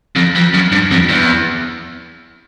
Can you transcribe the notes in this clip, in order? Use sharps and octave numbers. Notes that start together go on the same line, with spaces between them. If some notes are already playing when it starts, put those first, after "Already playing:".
F2
F2
F#2
G2
F2
E2